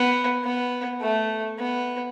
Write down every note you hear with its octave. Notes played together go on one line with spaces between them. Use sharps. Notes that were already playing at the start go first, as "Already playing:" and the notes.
Already playing: B3
B3
A3
B3